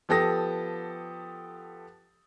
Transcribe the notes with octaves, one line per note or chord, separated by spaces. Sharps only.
F3 B3 G4 A4 D#6 A#6